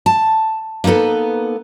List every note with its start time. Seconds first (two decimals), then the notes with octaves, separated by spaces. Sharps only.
0.06 A5
0.84 A#3 B3 D#4 A4 B4